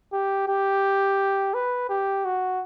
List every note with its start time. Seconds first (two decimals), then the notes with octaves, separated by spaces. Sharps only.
0.13 G4
0.48 G4
1.54 B4
1.89 G4
2.25 F#4